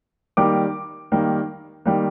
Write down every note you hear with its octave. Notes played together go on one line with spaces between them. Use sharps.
D#3 G3 A#3 D6
D#3 G3 A#3
D#3 G3 A#3